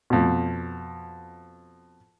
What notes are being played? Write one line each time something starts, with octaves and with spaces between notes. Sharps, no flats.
F2 B2